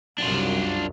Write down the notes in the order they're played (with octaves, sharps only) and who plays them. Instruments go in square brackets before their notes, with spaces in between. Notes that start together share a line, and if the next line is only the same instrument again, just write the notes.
[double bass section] C2 F#2 [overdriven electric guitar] D4 F4